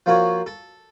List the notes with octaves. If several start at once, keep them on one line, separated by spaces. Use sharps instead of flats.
F3 A#3 F4 F#4 C#5
A4